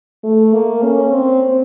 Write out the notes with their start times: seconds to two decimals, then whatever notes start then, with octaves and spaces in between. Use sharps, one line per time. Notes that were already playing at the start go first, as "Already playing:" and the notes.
0.24 A3
0.54 A#3
0.83 C#4
1.11 C4